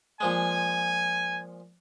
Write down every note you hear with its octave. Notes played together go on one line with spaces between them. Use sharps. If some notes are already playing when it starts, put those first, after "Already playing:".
A#2 F3 G#3 G#5